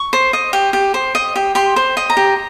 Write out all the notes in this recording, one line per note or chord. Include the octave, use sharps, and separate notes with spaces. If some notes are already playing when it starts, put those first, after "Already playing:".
Already playing: C#6
C5
D#5
G4
G4
C5
D#5
G4
G4 C6
C5
D#5
A#5
G4